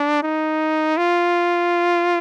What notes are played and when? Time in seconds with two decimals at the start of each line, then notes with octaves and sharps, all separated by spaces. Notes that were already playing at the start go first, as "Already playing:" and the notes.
Already playing: D4
0.23 D#4
0.97 F4